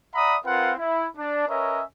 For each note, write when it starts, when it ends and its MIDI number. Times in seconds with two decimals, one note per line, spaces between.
0.14 0.36 74
0.14 0.36 76
0.14 0.36 78
0.14 0.36 82
0.14 0.36 83
0.14 0.36 87
0.45 0.72 60
0.45 0.72 65
0.45 0.72 70
0.45 0.72 71
0.45 0.72 77
0.45 0.72 78
0.77 1.05 64
1.17 1.47 62
1.48 1.82 61
1.48 1.82 70
1.48 1.82 71
1.48 1.82 73
1.48 1.82 75
1.48 1.82 76